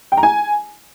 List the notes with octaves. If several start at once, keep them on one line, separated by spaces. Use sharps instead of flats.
G5
A#5
G#5